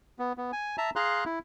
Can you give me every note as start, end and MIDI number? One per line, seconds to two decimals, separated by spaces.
0.19 0.33 59
0.37 0.51 59
0.52 0.76 80
0.78 0.90 76
0.78 0.90 81
0.78 0.90 82
0.96 1.24 68
0.96 1.24 77
0.96 1.24 82
0.96 1.24 84
0.96 1.24 90
1.25 1.39 64